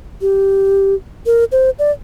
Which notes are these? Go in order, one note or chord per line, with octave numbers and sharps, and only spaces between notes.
G4
A#4
C5
D5